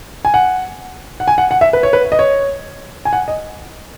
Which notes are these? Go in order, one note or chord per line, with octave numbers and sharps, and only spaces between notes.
G#5
F#5
F#5
G#5
F#5
F#5
E5
B4
C#5
B4
D#5
C#5
G#5
F#5
D#5